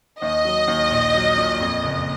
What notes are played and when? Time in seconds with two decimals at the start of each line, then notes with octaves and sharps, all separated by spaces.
0.22 D#2 D#5
0.45 F#3
0.68 D#2
0.91 A#1
1.14 F#3
1.38 A#2
1.60 F2
1.83 F#1